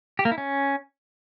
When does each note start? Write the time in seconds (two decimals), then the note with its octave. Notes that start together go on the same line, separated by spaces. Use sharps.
0.19 G4
0.25 A#3
0.31 E4
0.38 C#4